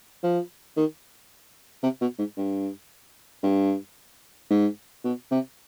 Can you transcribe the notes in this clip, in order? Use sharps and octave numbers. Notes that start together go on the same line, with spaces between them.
F3
D#3
C3
B2
G#2
G2
G2
G#2
B2
C3